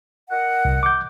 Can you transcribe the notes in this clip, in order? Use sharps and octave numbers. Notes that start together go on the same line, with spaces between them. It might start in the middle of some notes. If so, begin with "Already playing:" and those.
A#4 D#5 F#5
C2
D6 G6